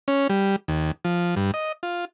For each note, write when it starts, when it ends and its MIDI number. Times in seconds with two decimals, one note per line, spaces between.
0.08 0.27 61
0.30 0.56 55
0.68 0.91 39
1.05 1.35 53
1.36 1.51 43
1.54 1.72 75
1.83 2.05 65